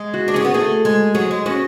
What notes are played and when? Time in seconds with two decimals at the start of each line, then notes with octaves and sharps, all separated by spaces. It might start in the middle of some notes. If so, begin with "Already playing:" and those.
Already playing: G#3 G#4
0.14 F#4
0.28 D4
0.34 C#4 G#4
0.45 B3
0.54 A3 G#4
0.85 G#3
1.15 F#3 G#4
1.31 G#3
1.46 C#4 F#4